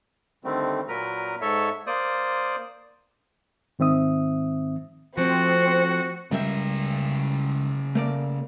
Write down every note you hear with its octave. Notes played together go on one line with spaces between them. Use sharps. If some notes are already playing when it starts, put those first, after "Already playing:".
D3 D#3 G3 A3 C4
A#2 F#3 A#4 B4 A#5
G#2 A4 C#5 E5
A#3 C5 D5 D#6
G#2 D#3 C4 E5 D#6
F3 A3 C4 F#4
C#2 C#3 G3 A#4 E5
A3 A#3 D5